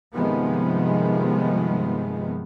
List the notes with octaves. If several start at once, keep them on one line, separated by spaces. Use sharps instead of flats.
G2 C3 D#3 F3 G#3 B3